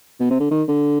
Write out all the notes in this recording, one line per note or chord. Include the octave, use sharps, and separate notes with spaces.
B2
C3
D3
D#3
D3